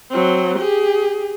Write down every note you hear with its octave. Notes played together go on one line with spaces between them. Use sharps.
F#3 C4
G4 G#4